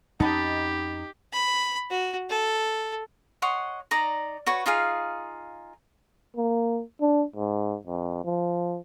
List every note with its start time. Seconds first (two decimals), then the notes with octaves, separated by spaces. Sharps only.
0.20 F2 C#4 D#4 G4 F#5 A5 B5
1.32 B5
1.90 F#4
2.29 A4
3.42 C#5 D#5 F#5 C6
3.91 D#4 D5 A#5
4.46 F#4 B4 C#5
4.66 D#4 F4 G#4 F5
6.36 A#3
7.01 D4
7.36 G#2
7.87 F2
8.24 F3